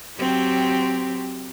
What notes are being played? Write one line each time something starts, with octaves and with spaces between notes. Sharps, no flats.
F#3 C4 G4